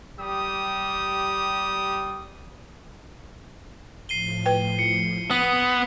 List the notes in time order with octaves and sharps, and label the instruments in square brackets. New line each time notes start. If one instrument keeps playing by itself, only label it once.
[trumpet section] G3 G4 D#6
[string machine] A2 F3 [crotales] C7 D#7 G7
[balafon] B4 G5
[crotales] C#7
[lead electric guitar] B3 [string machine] C6 E6 G#6 [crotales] D#6 B6